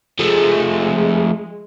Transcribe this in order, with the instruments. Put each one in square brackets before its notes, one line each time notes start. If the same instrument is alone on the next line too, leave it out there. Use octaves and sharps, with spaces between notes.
[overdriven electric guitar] F3 A3 [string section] G#3